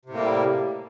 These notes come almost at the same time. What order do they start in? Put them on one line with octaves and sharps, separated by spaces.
C3 A2 A#3 G3